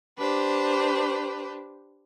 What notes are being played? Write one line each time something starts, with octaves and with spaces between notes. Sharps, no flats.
D4 G4 B4 C5